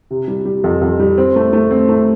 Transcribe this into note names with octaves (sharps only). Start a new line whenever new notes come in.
C3
G3
G3
F2
F2
G3
C4
A3
A3
C4
A3